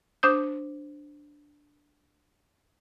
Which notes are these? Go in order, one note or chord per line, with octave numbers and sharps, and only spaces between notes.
D4 C5 D#6 G6